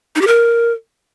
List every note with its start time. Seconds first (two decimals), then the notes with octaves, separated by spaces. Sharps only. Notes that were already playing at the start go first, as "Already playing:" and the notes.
0.16 D#4
0.21 G4
0.27 A#4